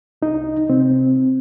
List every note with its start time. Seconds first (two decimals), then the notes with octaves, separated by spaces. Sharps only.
0.22 C2 D#4
0.69 C3 C4